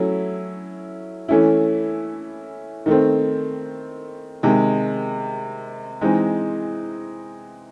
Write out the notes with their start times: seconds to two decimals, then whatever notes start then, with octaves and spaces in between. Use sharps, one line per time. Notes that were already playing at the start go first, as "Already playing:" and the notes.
Already playing: F#3 A3 C#4 E4
1.28 E3 A3 C#4 E4
2.86 D#3 A3 C4
4.43 C3 D#3 G#3
6.01 E3 G#3 C4 D#4